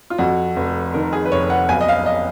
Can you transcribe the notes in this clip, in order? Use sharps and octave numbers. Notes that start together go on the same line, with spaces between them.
F4
F2 F#4
F1
D#3 A#4
G#4
B4
F1 C#5
F#5
B1 G#5
D#5
F5
D#5